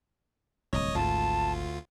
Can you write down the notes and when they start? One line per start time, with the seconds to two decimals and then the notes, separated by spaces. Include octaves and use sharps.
0.73 D1 C2 C#5 D#5 D#6
0.95 G#1 D2 G#2 F4 A5